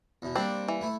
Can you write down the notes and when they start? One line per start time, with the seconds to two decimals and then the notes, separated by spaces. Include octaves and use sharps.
0.22 E2 B2
0.36 G3 A#3 C4 D4
0.68 E3
0.81 A3 E4